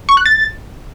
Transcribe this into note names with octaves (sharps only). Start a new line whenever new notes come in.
C#6
F#6
A6